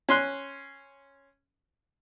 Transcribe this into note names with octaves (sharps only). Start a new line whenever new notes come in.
C#4 C6 F#6